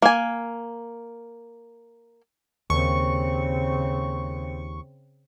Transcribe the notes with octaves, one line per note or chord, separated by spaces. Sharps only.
A#3 G#5
D#2 C#3 C4 C#6